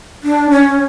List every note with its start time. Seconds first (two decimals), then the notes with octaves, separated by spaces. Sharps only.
0.23 D4
0.50 C#4